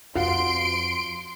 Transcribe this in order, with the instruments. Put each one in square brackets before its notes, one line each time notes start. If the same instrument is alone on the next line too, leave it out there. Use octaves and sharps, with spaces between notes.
[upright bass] F2 [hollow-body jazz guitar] F4 F#4 F#5 [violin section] C6 D7